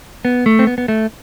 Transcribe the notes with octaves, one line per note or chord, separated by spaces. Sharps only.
B3
A3
C4
B3
B3
A3